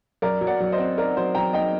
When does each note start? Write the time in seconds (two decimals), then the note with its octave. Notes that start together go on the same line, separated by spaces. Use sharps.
0.22 F#2 A#4 D5
0.41 F#3
0.47 D5 F#5
0.60 F#3
0.72 C5 D#5
0.78 C4
0.98 D#4 A#4 D5
1.17 F#3 C5
1.35 F#3 G5 A#5
1.53 D#4 D#5 G5